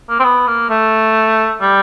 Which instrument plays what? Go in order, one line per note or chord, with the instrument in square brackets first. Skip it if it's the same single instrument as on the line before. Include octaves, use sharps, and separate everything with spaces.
[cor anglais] A#3
C4
B3
A#3
A3
G3